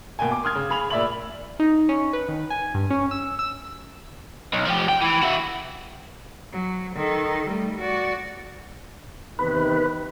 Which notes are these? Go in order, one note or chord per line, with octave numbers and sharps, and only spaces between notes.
B2 A#3 G5 G#5
D6
C6 D#6 F6 G#6
C#3
G#4 B5 F7
A#2 D5 E5 B5 F#7
D#4
C#4
B4
D#3
G#5
G2
C#4
E6
E6
B1
F3 G4
G5
E3
E4 F#4
F#3
D#3 A4
G3 A3
F#4 D5
E2 C3 D#3 B4